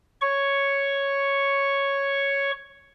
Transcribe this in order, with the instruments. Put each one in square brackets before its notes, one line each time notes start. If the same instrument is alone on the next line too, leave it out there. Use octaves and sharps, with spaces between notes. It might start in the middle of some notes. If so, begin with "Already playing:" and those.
[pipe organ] C#5 C#6